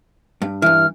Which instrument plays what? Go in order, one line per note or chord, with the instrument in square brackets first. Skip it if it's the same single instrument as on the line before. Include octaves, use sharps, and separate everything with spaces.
[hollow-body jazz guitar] G2
[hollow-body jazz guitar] G2 E3 [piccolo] F6